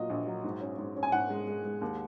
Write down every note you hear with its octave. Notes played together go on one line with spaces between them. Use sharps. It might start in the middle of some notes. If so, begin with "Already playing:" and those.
Already playing: A#2 F#3 D#5
A#1
F#3
G#2
C#4
G#2
C#4
G#5
G#2 F#5
G#3
G#3
G#3
D#2